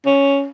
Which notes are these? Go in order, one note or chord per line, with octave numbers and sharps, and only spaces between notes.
C#4